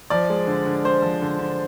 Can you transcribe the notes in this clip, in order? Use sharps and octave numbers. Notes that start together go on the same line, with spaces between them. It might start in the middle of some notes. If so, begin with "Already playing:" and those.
F3 D5
G#3
D3
D3
G#3 C5
F3
D3
D3